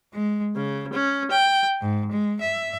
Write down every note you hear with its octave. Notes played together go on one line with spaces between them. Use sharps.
G#3
C#3
C#4
G5
G#2
G#3
E5